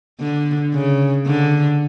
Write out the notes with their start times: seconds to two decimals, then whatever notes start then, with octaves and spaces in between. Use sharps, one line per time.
0.20 D3
0.74 C#3
1.27 D3